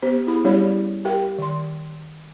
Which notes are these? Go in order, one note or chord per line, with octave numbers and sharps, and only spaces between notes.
B3 G4 C5
E4 G#4 B5
G3 C#4 E4 G4 C#5 D5
G4 A#4 F5 G5
D#3 C6